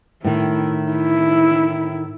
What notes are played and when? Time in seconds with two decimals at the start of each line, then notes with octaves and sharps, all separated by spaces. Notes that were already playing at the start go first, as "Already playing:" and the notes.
0.24 A2 D#3 E4
0.92 E4